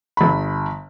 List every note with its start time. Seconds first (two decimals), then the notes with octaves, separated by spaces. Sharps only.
0.17 G1 B5